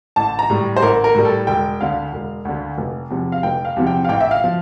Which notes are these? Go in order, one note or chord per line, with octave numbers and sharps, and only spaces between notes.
A1 A5
A#5
A2 G3
C5
A1 A#4
A#4
A2 G3
A4
E1 G5
D2 D3 F5
E1
D2 D3
F1
E2 C3 F3
F5
F1 G5
F5
E2 C3 F3
G5
F5
A1 G5
E5
F5
F3